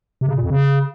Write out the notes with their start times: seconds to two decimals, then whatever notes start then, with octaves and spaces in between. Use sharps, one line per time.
0.21 C3
0.28 C#3
0.36 A#2
0.43 F2
0.50 C#3